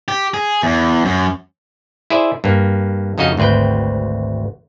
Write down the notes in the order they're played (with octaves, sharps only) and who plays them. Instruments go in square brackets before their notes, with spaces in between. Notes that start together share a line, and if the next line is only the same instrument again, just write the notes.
[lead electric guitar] G4
G#4
E2
F#2
[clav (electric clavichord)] E4 G#4 C5 D5 E5
G2 A#3
F2 C#3 D#4 F#4 D#5 F5
G#1 D2 C4 B4 G5